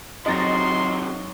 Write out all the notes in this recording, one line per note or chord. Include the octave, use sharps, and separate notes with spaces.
C3 D#3 F#3 D#5 C6 A6 A#6